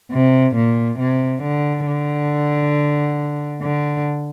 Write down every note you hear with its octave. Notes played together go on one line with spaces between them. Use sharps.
C3
A#2
C3
D3
D3
D3